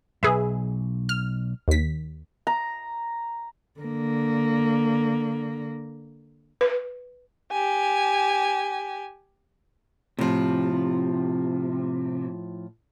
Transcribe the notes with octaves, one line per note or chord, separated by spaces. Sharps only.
B1 G2 G#4 B4 E5
F6
D#2 B6
A#5
D3 A#3
B4
G4 G#5
A2 C3 F3